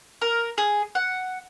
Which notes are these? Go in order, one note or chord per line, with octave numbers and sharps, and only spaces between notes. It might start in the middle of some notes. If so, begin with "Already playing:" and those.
A#4
G#4
F#5